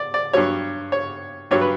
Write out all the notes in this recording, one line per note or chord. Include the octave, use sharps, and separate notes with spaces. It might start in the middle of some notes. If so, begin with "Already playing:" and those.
Already playing: D5
D5
G2 F#3 C#5
C#5
G2 F#3 C#5
B4